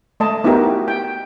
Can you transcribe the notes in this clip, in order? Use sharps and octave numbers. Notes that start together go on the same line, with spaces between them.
A3 D#5 A5
B3 D#4 E4 F#4 G4 A#4
G5